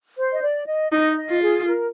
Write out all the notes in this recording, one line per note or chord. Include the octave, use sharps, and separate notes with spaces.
C5
D#5
D5
D#5
D#4 D#5
D#5
F4
G#4
A#4